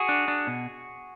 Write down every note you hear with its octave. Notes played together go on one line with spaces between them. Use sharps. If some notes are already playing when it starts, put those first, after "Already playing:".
Already playing: F#4 G#4
D4
D4
B2